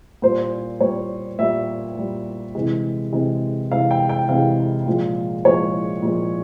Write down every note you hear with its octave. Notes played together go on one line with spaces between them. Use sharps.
A#2 G3 C5
A#2 G3 C#5
A#2 G3 E5
A#2 G3
C3 E3 G#3
C3 E3 G#3
C3 E3 G#3 F5
G5
G5
C3 E3 G#3 F5
A#2 F3 G#3
A#2 F3 G#3 C#5
A#2 F3 G#3